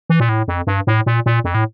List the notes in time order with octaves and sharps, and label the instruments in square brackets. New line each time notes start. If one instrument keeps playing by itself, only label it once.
[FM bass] E3
A#2
A2
F2
G2
A2
A#2
A#2
F2
A2